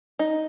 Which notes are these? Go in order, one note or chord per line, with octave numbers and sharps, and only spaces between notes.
D#4